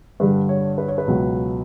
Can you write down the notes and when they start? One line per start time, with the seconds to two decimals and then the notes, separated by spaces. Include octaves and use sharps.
0.20 G2 D3 G3 B4
0.49 C#5
0.78 B4
0.88 C#5
0.98 B4
1.08 C#2 B2 F#3